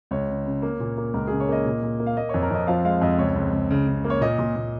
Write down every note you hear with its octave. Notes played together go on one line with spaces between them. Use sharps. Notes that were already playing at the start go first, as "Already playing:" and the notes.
C#2 C#5
C#3
C#3
A#3
A#2
A#3
C#2 A#4
C#3 G#4
C#5
A#3 D#5
A#2
A#2
A#3
F5
A#3 D#5
F2 C#5
A#4
F2 D#5
F3 F5
G#3 F5
F2 D#5
C#2 C#5
C#2
C#2
C#3
C#3
A#3
C#5
A#2 D#5
A#2
A#2